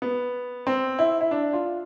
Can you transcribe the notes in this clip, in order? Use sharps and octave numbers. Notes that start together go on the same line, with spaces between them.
B3
C4
E4
E4
D4
F4